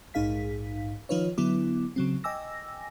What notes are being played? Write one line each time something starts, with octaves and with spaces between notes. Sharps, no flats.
A#1 G#2 D#4 G#4 F5 B6
D#3 F3 D#4 F4 B4 C#5
D3 F#3 B3 E4 D6
C#3 F#3 C4
D#5 G5 G#5 D6 E6 A#6